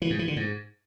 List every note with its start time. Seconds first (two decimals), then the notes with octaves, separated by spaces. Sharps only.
0.02 E3
0.10 G#2
0.19 E3
0.28 D3
0.36 G#2